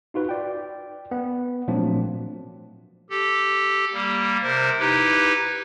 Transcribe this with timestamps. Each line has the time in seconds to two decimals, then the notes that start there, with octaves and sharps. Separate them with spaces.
0.14 D#4 F4 F#4 B4
0.29 D5 G5
1.11 B3
1.68 A#2 F3 F#3 A3 C4 D4
3.10 G4 A4
3.93 G3 A#3
4.42 C3 A#4 C5
4.79 D#4 E4 G4 B4